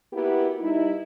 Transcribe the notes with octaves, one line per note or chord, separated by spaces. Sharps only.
A#3 B3 E4 F#4 G4
G3 D#4 E4